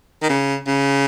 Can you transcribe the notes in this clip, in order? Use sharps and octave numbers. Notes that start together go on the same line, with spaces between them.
D#3
C#3
C#3